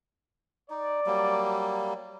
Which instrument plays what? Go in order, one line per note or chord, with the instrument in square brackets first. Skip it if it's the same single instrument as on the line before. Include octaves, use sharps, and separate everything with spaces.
[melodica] D#4 [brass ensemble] D5
[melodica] F#3 G3 A#3